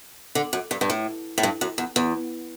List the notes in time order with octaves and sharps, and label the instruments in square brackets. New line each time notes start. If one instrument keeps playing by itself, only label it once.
[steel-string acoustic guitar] D3
F#2
G2
G2
A2
A2
G2
F#2
E2
E2